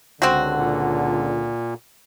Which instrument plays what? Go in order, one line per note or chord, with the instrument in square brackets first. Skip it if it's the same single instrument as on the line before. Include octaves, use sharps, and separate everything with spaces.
[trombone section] C#2 D3 [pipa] C4 F#4
[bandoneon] A#2